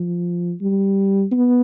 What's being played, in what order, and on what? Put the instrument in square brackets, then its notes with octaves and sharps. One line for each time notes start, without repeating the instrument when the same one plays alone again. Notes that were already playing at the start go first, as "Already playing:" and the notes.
Already playing: [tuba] F3
G3
B3